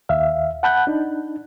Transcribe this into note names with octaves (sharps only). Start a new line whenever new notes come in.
D#2 E5 F5
F#5 A5 B5 F#6 G6
D4 D#4